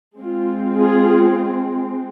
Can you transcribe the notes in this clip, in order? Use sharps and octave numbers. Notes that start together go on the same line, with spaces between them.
G#3 C4 F4
F4 G#4